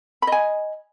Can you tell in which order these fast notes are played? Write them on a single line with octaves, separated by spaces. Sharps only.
B5 D#5 G#5